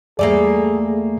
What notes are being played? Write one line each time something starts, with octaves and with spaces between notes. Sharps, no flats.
E2 G3 A3 A#3 G#4 D5